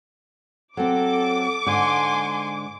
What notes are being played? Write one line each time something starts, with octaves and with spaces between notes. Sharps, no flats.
F#3 C4 A4 D6
G#2 D3 G#5 C6